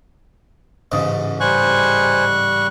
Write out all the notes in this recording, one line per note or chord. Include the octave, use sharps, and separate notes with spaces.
A1 G#2 C#3
G3 C5 G#5 C#6 F#6